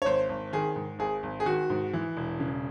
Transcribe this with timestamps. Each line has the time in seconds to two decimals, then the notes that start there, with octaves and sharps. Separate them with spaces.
0.02 C#5
0.05 G#1 C5
0.29 G#1
0.53 D#3 G#4
0.76 G#2
0.99 G#1 G#4
1.23 G#1
1.40 G#4
1.46 D#3 F#4
1.70 G#2
1.93 E3
2.17 E1
2.40 C#3